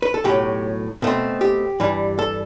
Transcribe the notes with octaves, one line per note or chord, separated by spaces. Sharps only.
B4
A4
B1 A2 F#3 G4
B2 A3 C4
G4
G2 E3 G3
A4